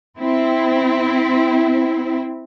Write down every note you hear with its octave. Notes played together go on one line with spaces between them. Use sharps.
C4 E4